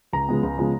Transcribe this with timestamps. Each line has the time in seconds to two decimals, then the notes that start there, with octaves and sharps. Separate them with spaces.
0.13 C#2 A#5
0.28 C#3 F3 G#3 B3
0.43 C#2
0.58 C#3 F3 G#3 B3